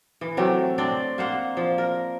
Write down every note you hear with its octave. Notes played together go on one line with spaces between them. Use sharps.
E3
C3 F#3 A3 G4
C4 D4 D5
A#3 C5 F#5
F3
A#4